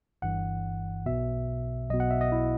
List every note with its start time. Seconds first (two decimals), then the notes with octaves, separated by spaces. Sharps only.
0.22 G1 G2 E3 F#5
1.06 B1 B2 E5
1.90 B1 B2 D#5
2.00 F#5
2.11 E5
2.21 D#5
2.32 E4